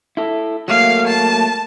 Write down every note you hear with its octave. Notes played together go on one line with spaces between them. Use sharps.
E4 A4
F#3 A3 A#3 F5
A5